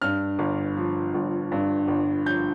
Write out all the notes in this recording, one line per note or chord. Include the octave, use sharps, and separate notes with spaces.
G2 F6
G1
F3
G1
G2
G1
F3 G6